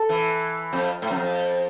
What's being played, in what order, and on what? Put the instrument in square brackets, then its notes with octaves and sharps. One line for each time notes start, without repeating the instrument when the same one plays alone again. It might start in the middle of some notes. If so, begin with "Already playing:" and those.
Already playing: [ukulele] A4
[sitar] E3
F2
A2
F#2
F2